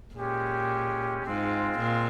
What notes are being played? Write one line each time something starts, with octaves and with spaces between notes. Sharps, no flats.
A#2 G#3 C#4 G4
G#2 G#3 C4 F4
A#2